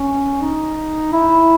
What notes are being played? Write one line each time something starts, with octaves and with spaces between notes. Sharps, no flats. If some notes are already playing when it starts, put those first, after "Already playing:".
Already playing: C#4
D#4
E4